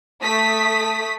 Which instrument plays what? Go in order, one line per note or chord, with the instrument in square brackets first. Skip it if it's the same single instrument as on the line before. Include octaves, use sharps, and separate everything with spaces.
[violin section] A3 D#6 B6